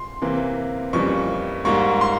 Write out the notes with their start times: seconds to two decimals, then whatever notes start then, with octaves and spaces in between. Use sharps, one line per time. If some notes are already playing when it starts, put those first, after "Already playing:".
Already playing: C6
0.22 C3 E3 A#3
0.93 F2 C#3 E3 G3 A#3 C#6
1.65 G#2 G3 A#3 C#6
2.01 C6